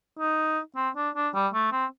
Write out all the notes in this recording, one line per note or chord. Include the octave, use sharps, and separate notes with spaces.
D#4
C4
D4
D4
G3
A3
C4